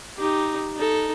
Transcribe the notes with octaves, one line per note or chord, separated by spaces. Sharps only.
D#4 G4
D#4 A4